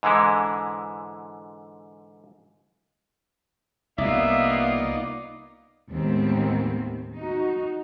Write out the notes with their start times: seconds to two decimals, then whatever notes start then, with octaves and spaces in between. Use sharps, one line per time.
0.03 G#2 D3 E3 G#3 E4
3.98 C2 A#3 B3 D#4 F4 D5 E5
5.91 D#2 A2 D#3 G#3 B3 C4
7.15 D#4 F#4